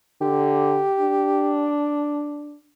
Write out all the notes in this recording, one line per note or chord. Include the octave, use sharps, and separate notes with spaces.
D3 G4
D4